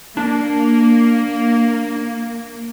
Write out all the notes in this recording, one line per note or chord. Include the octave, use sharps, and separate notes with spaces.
A#3 D4